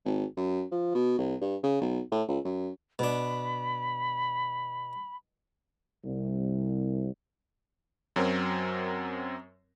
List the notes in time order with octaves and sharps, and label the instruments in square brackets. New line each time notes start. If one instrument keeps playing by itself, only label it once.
[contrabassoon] G#1
F#2
F3
B2
C2
G2
C#3
B1
A2
C#2
F#2
[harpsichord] B2 D4 [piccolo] B5
[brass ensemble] C2
[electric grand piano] F#2 F#3 C4 A#4